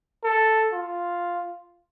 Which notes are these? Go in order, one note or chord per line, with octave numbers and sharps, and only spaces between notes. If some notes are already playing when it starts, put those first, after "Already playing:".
A4
F4